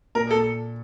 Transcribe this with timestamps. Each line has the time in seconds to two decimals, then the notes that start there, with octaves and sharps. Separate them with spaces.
0.15 A#2 A#4
0.31 A4
0.35 A#2